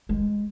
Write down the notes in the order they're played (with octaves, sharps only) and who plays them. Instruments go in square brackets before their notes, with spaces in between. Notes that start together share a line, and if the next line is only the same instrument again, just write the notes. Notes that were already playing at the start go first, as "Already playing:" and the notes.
[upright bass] G#3